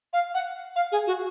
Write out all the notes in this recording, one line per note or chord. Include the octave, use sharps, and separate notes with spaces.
F5
F#5
F5
G#4
F#4